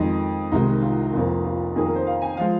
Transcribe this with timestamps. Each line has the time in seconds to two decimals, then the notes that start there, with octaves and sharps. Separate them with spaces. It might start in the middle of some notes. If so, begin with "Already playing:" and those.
Already playing: F2 D#3 G#3 D#5
0.52 C2 C3 D#3 G#3 D#4
0.82 F4
1.13 F1 F2 F3 A#3
1.44 F4
1.76 F2 D#3 A#3 G#4
1.86 A#4
1.95 C5
2.07 F5
2.22 G#5
2.37 F3 G#3 F5